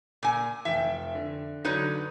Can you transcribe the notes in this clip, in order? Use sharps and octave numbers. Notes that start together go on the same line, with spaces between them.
A#2 G#5
F1 E5 G5
D3
D3 F#3 D#4 B4 C#5